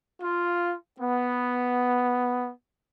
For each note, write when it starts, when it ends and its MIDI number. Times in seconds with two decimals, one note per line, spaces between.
0.22 0.75 65
1.00 2.50 59